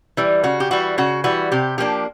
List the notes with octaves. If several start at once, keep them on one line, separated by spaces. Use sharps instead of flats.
E3 G3
C#3 F#4
G4
E3 G3 F#4
C#3 F#4
E3 G3 F#4
C3 G4
F3 A#3 D4 G4